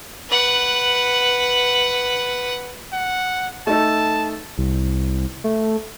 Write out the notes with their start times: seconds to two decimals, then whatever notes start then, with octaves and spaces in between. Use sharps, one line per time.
0.29 B4 F#5
2.93 F#5
3.67 A3 D#4 A4 A5
4.58 C2
5.44 A3